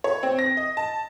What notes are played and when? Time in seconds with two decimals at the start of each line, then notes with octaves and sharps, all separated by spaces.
0.04 C#5
0.23 C4
0.39 A#6
0.57 D#5
0.77 A5